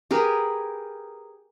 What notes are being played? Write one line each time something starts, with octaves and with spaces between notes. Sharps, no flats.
G4 G#4 A#4 B4